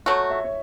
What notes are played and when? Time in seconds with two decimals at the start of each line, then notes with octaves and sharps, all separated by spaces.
0.06 F#3 A3 F#4 C#5
0.30 E5
0.44 C#5